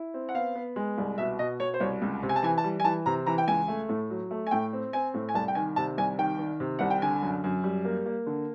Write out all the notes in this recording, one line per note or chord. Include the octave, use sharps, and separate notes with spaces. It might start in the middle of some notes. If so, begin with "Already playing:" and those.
Already playing: E4
C4
F#5
B3 F5
B3
G#3
C2
B2 E5
B2 D#5
B2 C#5
C5
C2 C#5
C#2
C3
G#5
A5
E3 G#5
A5
G3
G#5
E3 A5
C3 A#5
E3 A#5
G5
C#2 G#5
A3
A2
F#3
A3
G#5
A2 G5
C4
C4 G#5
A2
G#5
C2 A5
G5
D#3 G#5
C3 A5
C2 G#5
D#3 G5
D#3
C3
C2 F#5
G5
D3 G#5
F#2
F#2
G3
A#3
A#3
D3